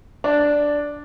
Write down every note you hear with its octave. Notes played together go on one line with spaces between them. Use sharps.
D4